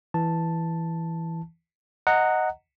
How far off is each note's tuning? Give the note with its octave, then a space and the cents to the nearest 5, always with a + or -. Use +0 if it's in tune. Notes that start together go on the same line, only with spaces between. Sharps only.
E3 +0 A5 +0
D#5 +0 F#5 +0 A#5 -20